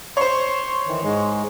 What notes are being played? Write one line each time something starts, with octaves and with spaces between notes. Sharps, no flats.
C5 C#5 C6
D#3 E3
G#2 G#3